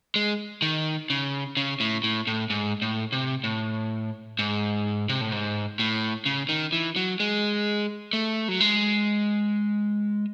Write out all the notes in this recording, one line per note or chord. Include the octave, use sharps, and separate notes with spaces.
G#3
D#3
C#3
C#3
A2
A2
A2
G#2
A2
C3
A2
G#2
C3
A2
G#2
A2
C#3
D#3
E3
F#3
G#3
A3
F#3
G#3